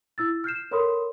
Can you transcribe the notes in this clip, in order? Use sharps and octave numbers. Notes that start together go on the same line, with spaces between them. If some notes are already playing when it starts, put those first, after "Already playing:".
E4 E6 A6
F6 G6 C7 E7
A4 A#4 C#5 B5 C6 D#6